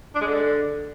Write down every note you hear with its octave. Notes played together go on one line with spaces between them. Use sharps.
D4
G#3
D3